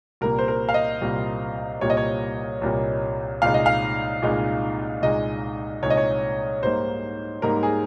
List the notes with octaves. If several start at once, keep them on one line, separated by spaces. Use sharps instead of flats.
C2 A#2 G3 A#3 A#4
C5
A#4
F5
D#5
C2 A#2 G3 A#3
C2 A#2 G3 A#3 C#5
D#5
C#5
C2 A#2 G3 A#3
C2 A#2 G#3 D#4 F5
D#5
F5
C2 A#2 G#3 D#4
C2 A#2 G#3 D#4 D#5
C2 A#2 G#3 D#4 C#5
D#5
C#5
G#2 G3 A#3 D#4 C5
G#2 G3 A#3 D#4 A#4
G#4